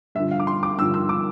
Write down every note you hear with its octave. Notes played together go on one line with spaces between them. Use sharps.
G2 D3 F3 E5
F5
D6
C6
D6
G2 D3 F3 E6
E6
D6